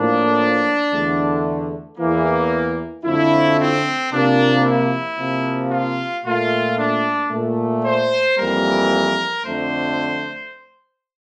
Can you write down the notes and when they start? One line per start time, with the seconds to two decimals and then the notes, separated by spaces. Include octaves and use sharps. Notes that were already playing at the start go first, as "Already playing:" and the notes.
Already playing: A2 F3 A#3 D4
0.91 E2 D3 A3
1.98 E2 E3 A#3
3.04 F2 D3 F3 A3 E4
3.58 C4
4.11 C3 F3 A#3 D4
4.64 E4
5.17 C3 F3 A#3
5.71 F4
6.24 A#2 A3 F4
6.77 D4
7.31 A#2 A3
7.84 C5
8.37 F2 E3 G3 A#3 A#4
9.43 F2 D3 A3 C5